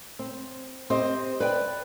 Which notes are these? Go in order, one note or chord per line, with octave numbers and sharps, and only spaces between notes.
C4
C4 G4 C5 D#5
B4 D5 G5